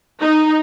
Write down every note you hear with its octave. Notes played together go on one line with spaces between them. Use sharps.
D#4